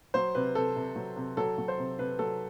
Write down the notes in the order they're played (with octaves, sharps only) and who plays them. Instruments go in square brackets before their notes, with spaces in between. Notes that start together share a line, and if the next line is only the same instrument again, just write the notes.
[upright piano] F#3 C5
C3 B4
C3 A4
C3
F#3
C3
F#3 A4
F#3
C5
C3
C3 B4
F#3 A4